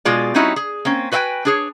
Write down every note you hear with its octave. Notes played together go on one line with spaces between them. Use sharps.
B2 G#3 F4 G#4 D5
G3 C4 C#4 D#4 E4 F#4
G#4
A#3 C4 C#4
F#4 B4 D#5 E5 G5 G#5
D4 G#4 C#5